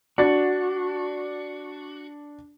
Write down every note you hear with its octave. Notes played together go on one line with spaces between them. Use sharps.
D4 F#4 A6